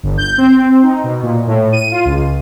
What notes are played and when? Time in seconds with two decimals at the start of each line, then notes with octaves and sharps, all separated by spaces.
0.03 G1
0.18 G6
0.38 C4
0.83 D#4
1.04 B2
1.23 A#2
1.47 A2
1.72 D#7
1.91 F4
2.05 C#2